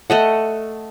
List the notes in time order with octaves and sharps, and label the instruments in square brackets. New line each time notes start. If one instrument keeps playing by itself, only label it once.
[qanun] A3 D#5 F#5